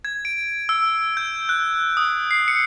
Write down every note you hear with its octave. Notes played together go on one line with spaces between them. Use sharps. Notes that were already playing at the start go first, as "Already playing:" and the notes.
G#6
D7
E6
G6
F#6
D#6
C7
C#7